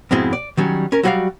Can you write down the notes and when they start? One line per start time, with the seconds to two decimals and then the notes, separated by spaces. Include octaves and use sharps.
0.11 F2 G#2 B2 G#3 C4 E4
0.33 D5
0.57 D#3 F#3 G3 C#4
0.92 C#4 A#4
1.03 F#3 G3 F#4 C#5 D5 F5